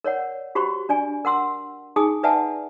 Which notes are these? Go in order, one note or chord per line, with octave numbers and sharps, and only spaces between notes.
A#4 C#5 D5 F#5
F#4 G4 C5 B5 C#6
D4 D5 G#5
A#4 F#5 C6 E6
D#4 G#4 G#5 D#6
B4 D5 E5 F#5 G#5 A5